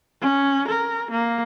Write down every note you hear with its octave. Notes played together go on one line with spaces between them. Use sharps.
C#4
A#4
A#3